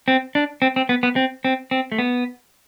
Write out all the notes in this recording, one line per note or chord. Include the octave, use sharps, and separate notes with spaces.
C4
D4
C4
C4
B3
B3
C4
C4
C4
A3
B3